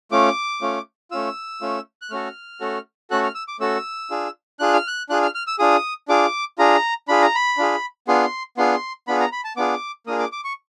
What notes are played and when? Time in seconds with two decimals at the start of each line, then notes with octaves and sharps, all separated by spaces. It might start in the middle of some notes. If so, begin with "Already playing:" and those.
0.12 A3 C#4 F4 D6
0.62 A3 C#4 F4
1.11 A3 C#4 F4 E6
1.61 A3 C#4 F4
2.02 F#6
2.11 A3 C#4 F#4 A4 F6
2.60 A3 C#4 F#4 A4
3.11 A3 C#4 F#4 A4 F#6
3.23 F6
3.35 E6
3.48 D6
3.60 A3 C#4 F#4 A4 E6
4.11 D4 F4 G#4
4.59 D4 F4 G#4 F#6
4.74 F6
4.87 F#6
5.09 D4 F4 G#4 F#6
5.22 F6
5.35 F6
5.47 E6
5.59 D4 F4 G#4 D#6
6.08 D4 F4 G#4 D6
6.58 D4 F4 G#4 A#5
7.08 D4 F4 G#4 B5
7.22 A#5
7.35 B5
7.58 D4 F4 G#4
8.08 B3 D4 F4 G#4 C6
8.57 B3 D4 F4 G#4 C6
9.08 B3 D4 F4 G#4 B5
9.20 A#5
9.32 B5
9.44 A5
9.57 B3 D4 F4 G#4 D6
10.07 A#3 D4 F4 G#4 D#6
10.19 D6
10.32 D6
10.44 C#6